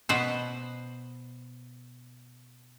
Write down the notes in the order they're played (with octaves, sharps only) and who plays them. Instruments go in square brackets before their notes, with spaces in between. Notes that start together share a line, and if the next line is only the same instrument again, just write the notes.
[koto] B2 B4 C5